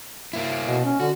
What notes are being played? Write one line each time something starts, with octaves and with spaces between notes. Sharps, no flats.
A#3 E4
B2
C#4
D3 F#4